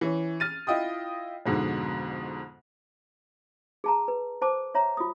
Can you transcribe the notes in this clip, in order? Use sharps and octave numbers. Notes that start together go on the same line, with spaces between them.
E3 C#4
F6 A6 D#7
E4 F4 D#5 G5 D#6
F2 G#2 B2 D3
G#4 A5 A#5
B4
C5 A5 D6
C#5 E5 A#5
F4 D#6